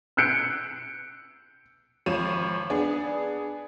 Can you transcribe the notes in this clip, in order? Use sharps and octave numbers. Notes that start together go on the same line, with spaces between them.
E6 F#6 G6 C#7 D7
G#1 F3 C#5 D#7 E7
B3 D4 G#4